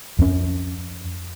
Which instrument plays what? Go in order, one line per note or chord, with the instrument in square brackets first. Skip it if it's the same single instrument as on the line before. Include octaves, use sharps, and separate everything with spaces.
[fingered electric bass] F2 C#4